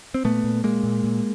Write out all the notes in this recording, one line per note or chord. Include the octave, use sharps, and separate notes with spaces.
C4
A#2 A3 B3
A#2
A#2 G#3 A#3
A#2
A#2